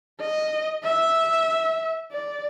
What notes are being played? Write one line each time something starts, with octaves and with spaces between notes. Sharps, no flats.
D#5
E5
D5